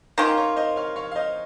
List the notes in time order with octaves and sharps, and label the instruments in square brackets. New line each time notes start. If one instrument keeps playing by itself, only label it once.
[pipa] D#3 A#3 C#4 F4
[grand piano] A#4 C#5
C5 D#5
C#5 F5
C#5 F5
F5
C5 D#5